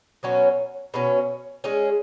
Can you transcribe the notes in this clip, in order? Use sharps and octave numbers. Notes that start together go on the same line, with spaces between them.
B2 F#3 C#4 F#4
B2 F#3 C#4
G#3 C#4 G#4